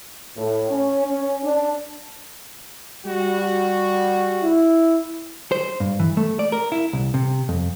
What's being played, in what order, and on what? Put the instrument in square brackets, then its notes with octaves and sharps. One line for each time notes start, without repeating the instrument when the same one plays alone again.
[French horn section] A2
C#4
C#4
D4
[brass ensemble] G3 F#4
[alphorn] E4
[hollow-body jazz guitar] C5
G2
E3
A3
D5
A#4
E4
C2
C3
F2